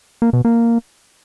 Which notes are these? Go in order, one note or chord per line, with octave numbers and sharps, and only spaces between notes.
A#3
B2
A#3